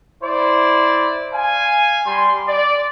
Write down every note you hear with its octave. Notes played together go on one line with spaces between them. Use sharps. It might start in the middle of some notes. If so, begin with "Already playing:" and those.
E4 C5 D5
F5 G#5
G3 C6
D5